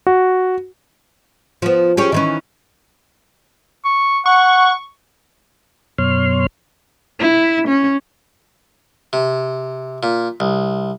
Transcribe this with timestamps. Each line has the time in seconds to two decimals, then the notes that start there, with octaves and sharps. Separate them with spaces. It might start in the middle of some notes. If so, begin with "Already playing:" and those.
0.07 F#4
1.62 F3 B3
1.97 C#4 G4 G#4
2.12 D#3 E3 C#4
3.85 C#6
4.26 F#5 C#6
5.98 F#2 B2 C#5 C6 F6
7.19 E4
7.67 C#4
9.13 C3
10.03 A#2
10.40 C2